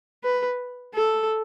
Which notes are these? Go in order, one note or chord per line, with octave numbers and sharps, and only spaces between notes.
B4
A4